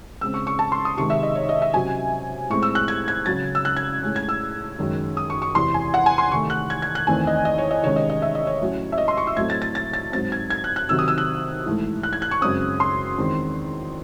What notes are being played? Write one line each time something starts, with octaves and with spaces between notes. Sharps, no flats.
C#3 G#3 C4 E6
C#6
C#6
A5
C6
D#6
C3 D#3 G#3 C#6
E5
D#5
C#5
D#5
E5
C3 F#3 C#4 G#5
A2 G#3 C4 C#6
E6
F#6
G#6
G#6
C#3 F#3 C#4 A6
E6
F#6
G#6
A2 G#3 C#4
G#6
E6
F#2 D#3 G#3 C#4
D#6
C#6
C#6
E2 C3 E3 C6
G#5
F#5
G#5
C6
C3 D#3 A3 C#6
F#6
G#6
G#6
F#6
E2 D#3 A3 C4 G#5
D#5
D#5
C#5
D#5
C3 D#3 G#3 C#4 C#5
D#5
D#5
E5
D#5
C#5
A2 F#3 C#4
E5
D#5
C6
C#6
E6
A2 F#3 A3 C4 G#6
A6
A6
A6
A6
G#2 F#3 C4 A6
G#6
G#6
F#6
F#6
C3 D#3 F#3 C4 E6
D#6
E6
F#6
G#2 E3 A3
F#6
G#6
F#6
C#6
F#2 C#3 G#3 C4 D#6
C6
E2 D#3 G#3 C4